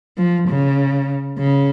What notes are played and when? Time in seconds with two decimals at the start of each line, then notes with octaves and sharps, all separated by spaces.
0.18 F3
0.48 C#3
1.38 C#3